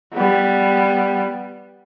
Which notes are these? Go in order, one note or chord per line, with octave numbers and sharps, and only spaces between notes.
G3 B3